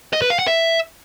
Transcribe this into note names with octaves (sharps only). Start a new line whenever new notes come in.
D#5
B4
F5
F#5
E5